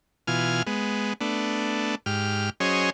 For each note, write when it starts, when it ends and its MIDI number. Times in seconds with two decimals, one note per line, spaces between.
0.27 0.63 47
0.27 0.63 52
0.27 0.63 65
0.27 0.63 80
0.27 0.63 89
0.67 1.13 56
0.67 1.13 59
1.21 1.95 57
1.21 1.95 59
1.21 1.95 62
2.06 2.50 44
2.06 2.50 67
2.06 2.50 89
2.60 2.90 54
2.60 2.90 61
2.60 2.90 68
2.60 2.90 72
2.60 2.90 73
2.60 2.90 75